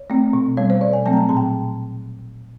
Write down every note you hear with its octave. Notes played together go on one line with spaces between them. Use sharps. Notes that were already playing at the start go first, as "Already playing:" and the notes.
Already playing: C#5
A3 C4
B2
G3 B3 C#5
C5
B2 D5
G#5
F#3 A3 C4 A5
A#5
A5
A#2 A5
G5